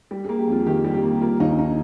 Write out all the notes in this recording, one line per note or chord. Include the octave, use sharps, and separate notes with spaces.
G3
A#3 G#4
G4
F2 F4
D#3 G4
G3
G4
A#3
A#3 F4
D#2 D#4
D#4